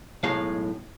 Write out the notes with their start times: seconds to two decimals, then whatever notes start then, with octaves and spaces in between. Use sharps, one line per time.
0.23 B1 A2 G#3 F5